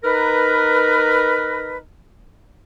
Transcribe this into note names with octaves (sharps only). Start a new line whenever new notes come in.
D#4 A#4 B4